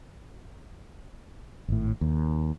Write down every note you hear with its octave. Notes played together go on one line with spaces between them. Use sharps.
G#1 A2
D#2